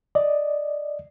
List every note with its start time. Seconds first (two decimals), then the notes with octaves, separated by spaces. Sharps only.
0.15 D5 D#5